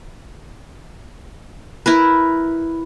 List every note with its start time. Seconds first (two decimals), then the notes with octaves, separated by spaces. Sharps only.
1.86 E4 A#4 B4